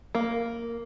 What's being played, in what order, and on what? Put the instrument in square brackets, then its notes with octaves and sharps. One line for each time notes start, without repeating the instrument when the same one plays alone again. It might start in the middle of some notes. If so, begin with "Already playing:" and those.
[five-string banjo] A#3